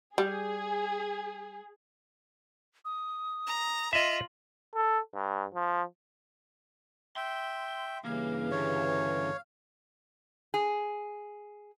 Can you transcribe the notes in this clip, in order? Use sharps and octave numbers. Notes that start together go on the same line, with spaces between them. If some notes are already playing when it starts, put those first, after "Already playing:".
G3 G#4
D#6
A#5
F4 D#5 E5 F#7
A4
G2
F3
E5 G5 C6
G2 C#3 E3 A#3 F5
D2 C#5
G#4